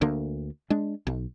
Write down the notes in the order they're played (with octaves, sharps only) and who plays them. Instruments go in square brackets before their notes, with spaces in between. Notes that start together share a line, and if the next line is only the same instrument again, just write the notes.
[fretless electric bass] D2 D3 A#3 D4
G#3 D4
B1